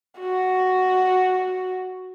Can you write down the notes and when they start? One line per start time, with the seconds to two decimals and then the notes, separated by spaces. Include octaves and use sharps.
0.20 F#4